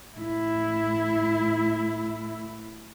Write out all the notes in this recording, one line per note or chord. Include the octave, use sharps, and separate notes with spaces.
A2 E4